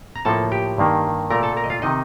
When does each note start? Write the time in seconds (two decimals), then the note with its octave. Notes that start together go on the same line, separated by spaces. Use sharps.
0.16 A#5
0.25 A2 F3 A#3 A4 A5
0.52 G4 G5
0.78 G2 D#3 A#3
1.30 A#2 A3 A#4 A#5
1.43 A4 A5
1.57 A#4 A#5
1.64 D#5
1.70 F4 F5
1.82 C3 D#3 D#4 D#5